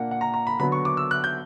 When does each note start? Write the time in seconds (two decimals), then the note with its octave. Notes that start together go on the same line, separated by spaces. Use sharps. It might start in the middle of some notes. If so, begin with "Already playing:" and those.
Already playing: A#2 A#3 D4 F#5
0.11 F#5
0.21 A#5
0.34 A#5
0.47 B5
0.59 D3 F#3 B3 B5
0.72 C#6
0.85 D6
0.97 E6
1.11 F#6
1.24 G6